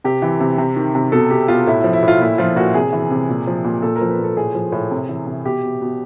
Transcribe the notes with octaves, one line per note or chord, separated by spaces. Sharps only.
C3 G4
E3
C3
C3
D#3
C3
B2 A4
B2 G4
B2 F4
A2 E4
F3 E4
E4
A2
F4
A#2 E4
F3 F4
A#2 F#4
C3 G#4
E3
C3
A#2
F3
A#2
A#2 A4
A#4
F3
B4
A#2
A4
A2 G#4
F3
A2
C3
E3
C3
B2 G4
B2
B2